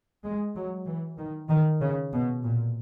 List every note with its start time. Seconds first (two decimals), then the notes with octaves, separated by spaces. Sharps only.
0.24 G#3
0.55 F#3
0.87 E3
1.18 D#3
1.49 D#3
1.80 C#3
2.12 B2
2.43 A#2